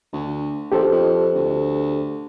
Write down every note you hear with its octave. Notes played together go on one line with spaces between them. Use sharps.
D2
A#1 G4 A4 C5
F2
D2